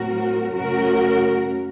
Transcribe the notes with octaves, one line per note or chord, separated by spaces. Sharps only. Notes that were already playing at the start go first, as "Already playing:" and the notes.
Already playing: A2 F#3 C4 F#4 A#4
F#2 C#3 A3 F#4 A#4